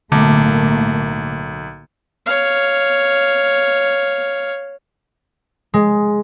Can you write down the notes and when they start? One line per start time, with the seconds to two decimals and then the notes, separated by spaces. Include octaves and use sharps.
0.12 B1 A2 D3 A3 A#3
2.26 C#5 F5
5.74 G#3